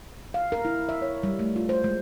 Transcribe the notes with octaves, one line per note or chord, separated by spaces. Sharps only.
F5
A#4
E4
E5
C#5
G3
A3
F4
C5
G#3